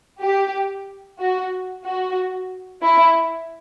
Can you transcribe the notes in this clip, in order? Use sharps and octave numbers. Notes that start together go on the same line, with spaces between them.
G4
F#4
F#4
E4